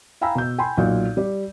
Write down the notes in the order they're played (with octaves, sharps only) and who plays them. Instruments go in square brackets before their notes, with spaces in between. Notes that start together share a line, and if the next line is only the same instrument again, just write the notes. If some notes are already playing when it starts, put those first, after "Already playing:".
[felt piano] F5 G5 G#5 A#5 B5 E6
B2 G6
G5 G#5 B5 C6
B1 A#2 F#4 F5 G6
G3 D5